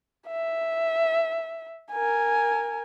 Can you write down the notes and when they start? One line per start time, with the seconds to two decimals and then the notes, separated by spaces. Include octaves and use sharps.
0.28 E5
1.91 A#4 G#5